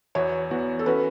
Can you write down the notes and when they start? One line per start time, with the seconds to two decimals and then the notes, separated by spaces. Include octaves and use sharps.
0.15 E2 E3 B3 F#4 C#5
0.51 E2 E3 B3 F#4
0.79 A4
0.86 E3 C#4 F#4 B4